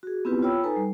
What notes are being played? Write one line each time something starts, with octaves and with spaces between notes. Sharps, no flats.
F#4 G#4
B3 C4 E4 F4 G4 B4
F4 C#5 G5 B5 E6
D#4 A4 B4 G#5 A#5
G3